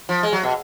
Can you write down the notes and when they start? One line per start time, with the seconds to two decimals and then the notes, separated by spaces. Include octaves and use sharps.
0.09 F3
0.23 G#3
0.33 F#3
0.43 B2